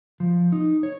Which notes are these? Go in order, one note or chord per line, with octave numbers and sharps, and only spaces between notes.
F3
D#4
C#5